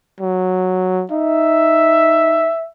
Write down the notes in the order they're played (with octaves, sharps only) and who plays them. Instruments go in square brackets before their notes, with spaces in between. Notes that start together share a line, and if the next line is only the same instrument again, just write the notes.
[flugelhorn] F#3
[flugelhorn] D#4 [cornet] E5